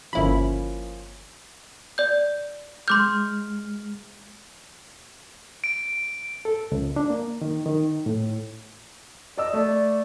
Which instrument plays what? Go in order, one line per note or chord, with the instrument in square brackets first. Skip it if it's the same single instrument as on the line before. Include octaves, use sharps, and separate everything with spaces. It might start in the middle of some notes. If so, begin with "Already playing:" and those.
[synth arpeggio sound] G1 E4 B5 [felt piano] F3 A#3 C#4
[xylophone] D5 G6
[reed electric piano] G#3 F6 [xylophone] C6 D6 G6
[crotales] D7
[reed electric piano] A4
C#2
D4
A#3
D#3
D#3
A2
[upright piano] D5 D#6 E6 [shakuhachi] D#5
[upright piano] A3 [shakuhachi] D5